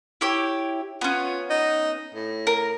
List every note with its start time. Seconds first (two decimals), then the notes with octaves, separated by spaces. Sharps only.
0.21 E4 G4 C#5
1.01 B3 C#4 F4
1.50 D#4
2.14 A2
2.47 A#4